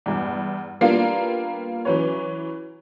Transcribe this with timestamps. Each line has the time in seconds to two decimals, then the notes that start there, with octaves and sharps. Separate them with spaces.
0.06 E2 G2
0.81 G3 A#3 B3 D4 F4
1.85 E3 F#3 C#4 B4 C#5